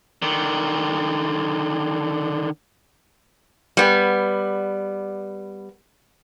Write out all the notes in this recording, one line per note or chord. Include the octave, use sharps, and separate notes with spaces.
D3 D#3
G3 B3